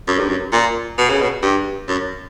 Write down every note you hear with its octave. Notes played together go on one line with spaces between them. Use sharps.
F#2
G2
F#2
A#2
B2
C#3
B2
G2
F#2